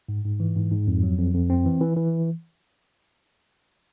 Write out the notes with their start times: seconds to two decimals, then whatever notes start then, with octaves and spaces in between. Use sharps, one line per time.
0.09 G#2
0.25 G#2
0.40 E3
0.55 G#2
0.71 G#2
0.87 F2
1.03 F#3
1.18 F2
1.34 F2
1.50 C4
1.65 E3
1.81 E3
1.97 E3